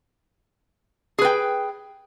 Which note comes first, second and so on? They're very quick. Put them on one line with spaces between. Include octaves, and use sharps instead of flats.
G#4 B4 G5